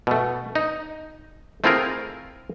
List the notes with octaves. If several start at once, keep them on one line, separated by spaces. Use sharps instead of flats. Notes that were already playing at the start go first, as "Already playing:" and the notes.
B2 A3
D#4
A3 C4 E4 F4 G#4 A#4